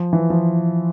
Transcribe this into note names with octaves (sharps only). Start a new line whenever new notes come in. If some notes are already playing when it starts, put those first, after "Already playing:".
Already playing: F3
E3
F3